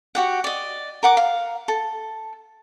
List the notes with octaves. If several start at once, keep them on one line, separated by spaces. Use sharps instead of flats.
F#4 G4 F#5
D5 D#5
A#4 F#5 D6
F5
A4